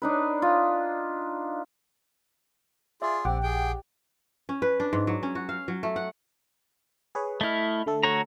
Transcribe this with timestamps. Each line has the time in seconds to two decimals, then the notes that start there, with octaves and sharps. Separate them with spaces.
0.02 D4 D#4 B4
0.42 F4
3.02 F4 G#4 D5 E5
3.25 A#1 C4 G4 F#5 D6
3.43 G#4 G5
4.49 C#4
4.62 B4
4.80 D4
4.93 G#2
5.07 F#3
5.23 C#4
5.35 F#4
5.49 F5
5.68 F#3
5.83 A3
5.96 F#5
7.15 G#4 B4 C#5
7.41 A3 E4 D#5 B5 F6
7.86 D3 A3 A4
8.03 F#4 C#5 A#5